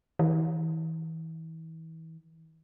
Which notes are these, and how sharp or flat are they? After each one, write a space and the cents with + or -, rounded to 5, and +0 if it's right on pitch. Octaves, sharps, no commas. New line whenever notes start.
E3 -35